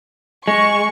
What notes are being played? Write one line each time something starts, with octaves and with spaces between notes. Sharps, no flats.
G#3 C#6